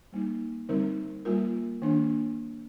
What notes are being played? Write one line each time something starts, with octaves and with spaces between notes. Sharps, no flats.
G3 A#3 D#4
D3 G3 C4 D#4 A#4
G3 A#3 F4 A#4
D#3 A#3 D4